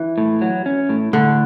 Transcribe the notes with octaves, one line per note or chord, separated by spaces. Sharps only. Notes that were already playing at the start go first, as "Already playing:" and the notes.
Already playing: E3
A2
F#3
C#4
A2
A2 D3